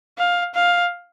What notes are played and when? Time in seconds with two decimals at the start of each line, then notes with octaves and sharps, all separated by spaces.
0.18 F5
0.55 F5